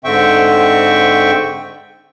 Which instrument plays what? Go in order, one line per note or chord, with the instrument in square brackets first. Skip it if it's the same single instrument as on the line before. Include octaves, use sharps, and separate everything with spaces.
[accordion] G#2 D3 C4 E5 G5 C#6